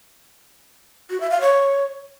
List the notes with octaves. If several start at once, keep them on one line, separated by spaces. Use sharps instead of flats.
F#4
E5
F5
C#5